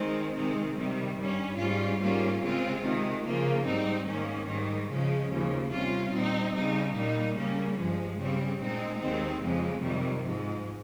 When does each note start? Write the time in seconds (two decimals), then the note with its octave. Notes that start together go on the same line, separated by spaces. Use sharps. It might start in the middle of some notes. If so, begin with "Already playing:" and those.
Already playing: D#3 G#3 C4
0.35 C3 D#3 G#3 C4
0.75 C3 D#3 G3
1.17 G2 G3 C#4
1.58 G#2 G3 C#4 F4
1.99 G#2 G3 A#3 C#4 F4
2.41 C#3 G#3 C4 F4
2.82 C3 D#3 G#3
3.23 C#3 F3 A#3 F4
3.64 G#2 G3 C4 D#4
4.06 G#2 D#3 A#3 C#4
4.47 G#2 D#3 G3
4.88 C#3 F3 G#3 C#4
5.29 D#2 C#3 F3
5.70 C3 G3 C#4 F4
6.11 A#2 G3 C4 D#4
6.53 C#3 G3 C4 D#4
6.94 A#2 G3 A#3 D#4
7.35 C#3 G3 A#3 C#4
7.76 G2 F3 G#3
8.18 C#3 G3 C4
8.59 A#2 G#3 C4 D#4
9.00 D#2 D#3 G#3 C4
9.41 F2 C#3 F3 G#3
9.83 F2 C3 D#3 G3
10.24 G#2 F3 G#3